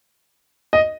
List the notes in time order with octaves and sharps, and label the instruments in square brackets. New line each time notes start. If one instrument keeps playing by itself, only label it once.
[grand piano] D#5